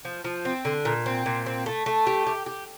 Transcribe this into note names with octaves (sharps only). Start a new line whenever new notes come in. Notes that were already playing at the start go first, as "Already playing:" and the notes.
F3
F3
C4
D3
A#2
C4
A#2
C4
A3
A3
G4
G4
G4